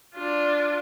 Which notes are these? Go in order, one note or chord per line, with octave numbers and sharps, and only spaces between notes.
D4 F4